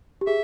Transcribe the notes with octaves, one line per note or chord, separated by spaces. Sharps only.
G4
G#4 E5